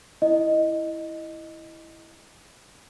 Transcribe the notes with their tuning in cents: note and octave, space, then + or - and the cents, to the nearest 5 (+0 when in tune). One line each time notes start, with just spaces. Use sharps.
E4 +0 D#5 -5